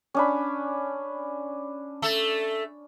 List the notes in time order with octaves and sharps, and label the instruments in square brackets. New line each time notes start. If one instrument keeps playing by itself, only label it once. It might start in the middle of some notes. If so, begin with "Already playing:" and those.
[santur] C#4 D4 B5
[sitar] A3 A4